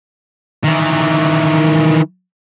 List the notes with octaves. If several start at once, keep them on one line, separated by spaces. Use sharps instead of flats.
D#3 E3